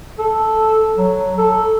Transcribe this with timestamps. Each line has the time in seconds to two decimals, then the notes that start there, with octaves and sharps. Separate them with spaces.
0.19 A4
0.97 F#3
1.38 A4